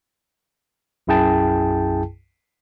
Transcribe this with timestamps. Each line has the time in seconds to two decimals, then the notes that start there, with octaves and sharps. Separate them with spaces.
1.07 B1 F#2 E4 G#4 G5 A5